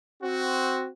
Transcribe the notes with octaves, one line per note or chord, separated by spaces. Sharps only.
C4 F#4